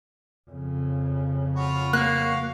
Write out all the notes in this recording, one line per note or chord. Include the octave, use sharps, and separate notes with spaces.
F2 C#3
F4 F#4 B5
A#3 F#4 F5 F#6